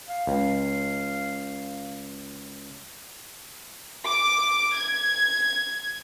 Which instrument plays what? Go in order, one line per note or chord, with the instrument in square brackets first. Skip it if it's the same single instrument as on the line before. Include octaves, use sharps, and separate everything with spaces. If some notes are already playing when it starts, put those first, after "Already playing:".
[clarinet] F5
[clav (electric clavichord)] C#2
[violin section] D6
G#6